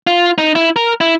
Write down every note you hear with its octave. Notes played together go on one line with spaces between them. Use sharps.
F4
D#4
E4
A#4
E4